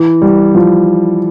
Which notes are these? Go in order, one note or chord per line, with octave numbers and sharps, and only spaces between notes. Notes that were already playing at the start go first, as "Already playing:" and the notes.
Already playing: E3
G3
F3